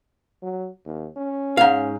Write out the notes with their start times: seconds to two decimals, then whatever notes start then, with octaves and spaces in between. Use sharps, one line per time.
0.43 F#3
0.85 D#2
1.17 C#4
1.57 G#2 F5